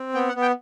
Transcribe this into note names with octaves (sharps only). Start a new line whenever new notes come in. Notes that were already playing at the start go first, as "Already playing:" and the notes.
Already playing: C4
B3 G5
F#5
B3
G5